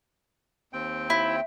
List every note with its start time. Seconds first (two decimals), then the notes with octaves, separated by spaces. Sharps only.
0.73 D#2 C4 G5
1.10 E4